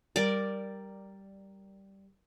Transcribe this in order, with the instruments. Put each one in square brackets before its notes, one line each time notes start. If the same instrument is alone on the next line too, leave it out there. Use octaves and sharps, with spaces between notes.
[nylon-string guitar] G3 [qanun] A#4 D5